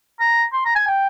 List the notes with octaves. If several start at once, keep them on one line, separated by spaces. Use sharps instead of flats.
A#5
C6
A#5
G#5
G5